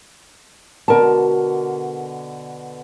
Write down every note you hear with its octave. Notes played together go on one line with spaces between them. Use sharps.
B2 D3 A#4 A5